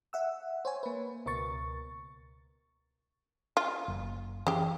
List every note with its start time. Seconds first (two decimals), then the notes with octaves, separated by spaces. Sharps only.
0.13 E5 F#5 E6
0.65 C5 C#5 G#5
0.83 A#3 B4
1.26 C#2 B2 A#4 C#6 A6
3.57 F4
3.88 F#1
4.47 C#3 E3 G4